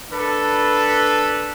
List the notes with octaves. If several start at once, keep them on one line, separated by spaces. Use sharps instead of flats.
D4 A4 B4